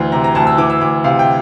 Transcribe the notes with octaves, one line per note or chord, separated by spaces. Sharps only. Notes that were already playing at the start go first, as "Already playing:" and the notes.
Already playing: D2 E3
C3 A#5
A#5
D2 A5
E6
E3 D6
E6
D2 D6
C3 F5
G5